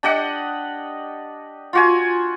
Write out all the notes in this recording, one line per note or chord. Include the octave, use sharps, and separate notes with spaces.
D4 G4 D#5 F#5
F4 F#4 G#5